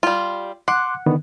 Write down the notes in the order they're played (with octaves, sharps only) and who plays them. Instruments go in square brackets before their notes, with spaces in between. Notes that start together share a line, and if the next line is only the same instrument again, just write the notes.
[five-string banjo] G3 F4
[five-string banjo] F#5 [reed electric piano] C6 D6 F#6
[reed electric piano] D3 D#3 B3